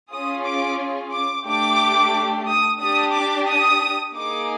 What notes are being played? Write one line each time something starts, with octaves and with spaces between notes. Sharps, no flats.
C#4 F4 G#4 D#6
D6
D6
A3 D4 G4 D6
D#6
D4 G4 D#6
D6
D#6
A#3 D#4 G#4 D6